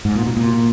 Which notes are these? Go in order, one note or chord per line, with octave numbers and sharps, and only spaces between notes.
G#2
A#2
B2
A#2